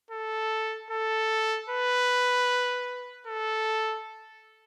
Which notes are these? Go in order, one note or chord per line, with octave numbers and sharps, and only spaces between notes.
A4
A4
B4
A4